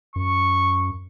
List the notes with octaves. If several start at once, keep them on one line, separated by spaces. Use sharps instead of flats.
F#2 C#6